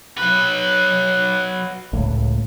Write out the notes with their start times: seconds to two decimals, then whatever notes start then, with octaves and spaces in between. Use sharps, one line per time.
0.17 F#3 B4
1.93 C#2 A2